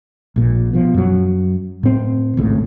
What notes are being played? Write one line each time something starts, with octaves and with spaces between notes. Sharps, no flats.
A#1 A#2
B2 F3
F#2 F#3
A2 C4
G#1 C#2 A2